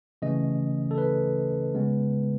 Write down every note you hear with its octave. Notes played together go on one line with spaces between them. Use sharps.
C#3 E3 A3 C#4 D#5
A4
B4
C#3 G#3 B3